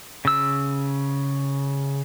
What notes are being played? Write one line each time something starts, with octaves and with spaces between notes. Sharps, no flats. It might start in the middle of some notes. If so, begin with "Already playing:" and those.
C#3 E6